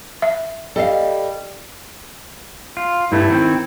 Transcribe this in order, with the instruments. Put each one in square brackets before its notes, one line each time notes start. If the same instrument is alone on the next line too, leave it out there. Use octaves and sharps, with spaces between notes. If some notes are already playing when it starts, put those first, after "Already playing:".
[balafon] E5
[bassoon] G3 [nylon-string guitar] A4 D#5 F5
[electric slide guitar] F4
[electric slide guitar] G2 A3 [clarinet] E4
[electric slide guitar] D#3 C4